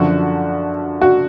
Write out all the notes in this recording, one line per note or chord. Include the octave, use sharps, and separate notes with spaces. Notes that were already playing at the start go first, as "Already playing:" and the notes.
Already playing: F#2 D3 F3 F#4
F#4